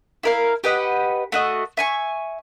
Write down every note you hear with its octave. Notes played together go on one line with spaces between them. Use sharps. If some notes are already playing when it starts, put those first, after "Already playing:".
E4 A#4 F5
G4 B4 D#5 F#5
A3 F#4 D#5
E5 G#5 C#6